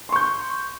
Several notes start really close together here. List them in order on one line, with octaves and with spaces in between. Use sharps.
C6 C#6 G6